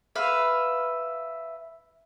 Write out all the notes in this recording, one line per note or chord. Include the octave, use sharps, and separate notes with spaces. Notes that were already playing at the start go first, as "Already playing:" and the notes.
B4 E5 F5